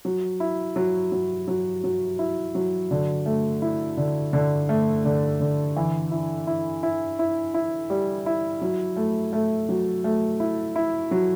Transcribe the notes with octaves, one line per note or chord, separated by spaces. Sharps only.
F#3
E4
F#3
F#3
F#3
F#3
E4
F#3
D3
A3
E4
D3
D3
A3
D3
D3
E3
E4
E4
E4
E4
E4
G3
E4
F#3
A3
A3
F#3
A3
E4
E4
F#3